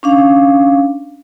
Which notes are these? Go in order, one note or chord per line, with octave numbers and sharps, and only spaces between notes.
C#4 D4 F5